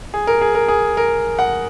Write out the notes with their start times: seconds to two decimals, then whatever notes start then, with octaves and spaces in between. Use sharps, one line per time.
0.14 G#4
0.27 A#4
0.41 G#4
0.55 A#4
0.68 G#4
0.97 A#4
1.39 F#5